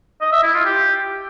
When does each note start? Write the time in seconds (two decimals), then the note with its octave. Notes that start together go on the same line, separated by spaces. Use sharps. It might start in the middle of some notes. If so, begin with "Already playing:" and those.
0.21 D#5
0.32 E5
0.43 E4
0.54 F4
0.65 G4